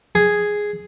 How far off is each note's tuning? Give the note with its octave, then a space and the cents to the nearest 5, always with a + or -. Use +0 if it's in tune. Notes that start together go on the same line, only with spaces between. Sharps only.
G#4 +0